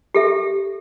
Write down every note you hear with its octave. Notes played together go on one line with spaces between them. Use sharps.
G4 A4 E5